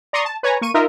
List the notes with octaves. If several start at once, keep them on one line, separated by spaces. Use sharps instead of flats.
D5 A#5 C6 C#6 D#6
A5
B4 C#5 G#5 A#5
A#3 C#6 D#7
D#4 F4 A#4 D#5 E5